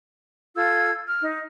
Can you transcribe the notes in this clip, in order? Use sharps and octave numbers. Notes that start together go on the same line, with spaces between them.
F4 A4 E6 G#6
F6
D#4